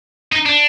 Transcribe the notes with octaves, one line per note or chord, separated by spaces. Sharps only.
D#4
D4